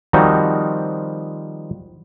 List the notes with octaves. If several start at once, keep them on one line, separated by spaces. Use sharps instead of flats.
D#3 F3 G3 C4 D#4 F#4